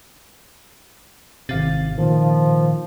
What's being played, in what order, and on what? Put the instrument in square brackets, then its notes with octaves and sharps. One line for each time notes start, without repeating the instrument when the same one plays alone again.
[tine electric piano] G#1 F5 A6 [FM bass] C3
[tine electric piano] A#2 D#3 [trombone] F3